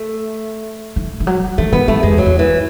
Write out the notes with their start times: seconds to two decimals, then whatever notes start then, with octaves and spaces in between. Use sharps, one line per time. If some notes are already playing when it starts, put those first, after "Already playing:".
Already playing: A3
0.96 E3
1.20 E3
1.27 F#3
1.58 E3 A3
1.72 E3 B3
1.88 D#3 A3
2.03 F#2 G#3
2.11 E2
2.18 F#3
2.26 E2
2.39 E3